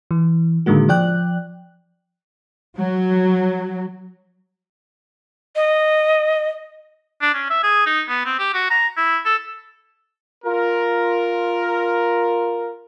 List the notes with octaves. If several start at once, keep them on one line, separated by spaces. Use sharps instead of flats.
E3
A2 D3 D#3 G#3 A#3 F#4
F3 D5 G5 F#6
F#3
D#5
D4
C#4
E5
G#4
D#4
B3
C4
G4
F#4
A#5
E4
A4
F4 A#4